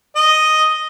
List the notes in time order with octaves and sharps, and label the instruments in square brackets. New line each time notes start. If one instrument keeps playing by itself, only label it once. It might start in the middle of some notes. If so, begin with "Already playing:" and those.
[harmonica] D#5